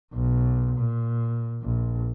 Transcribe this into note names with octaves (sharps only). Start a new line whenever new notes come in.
B1
A#2
A#1